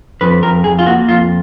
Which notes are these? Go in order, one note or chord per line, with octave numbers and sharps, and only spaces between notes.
F2 B4
F2 A#4
F2 G#4
F4
A#3 F#4
F2 F4